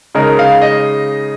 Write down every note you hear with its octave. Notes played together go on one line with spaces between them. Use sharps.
C#3 G#3 D#4 A#4
F5
D#5